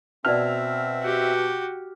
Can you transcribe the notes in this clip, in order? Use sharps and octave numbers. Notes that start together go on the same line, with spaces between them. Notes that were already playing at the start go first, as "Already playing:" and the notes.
B2 C4 D5 E5 A5 F6
F#4 G4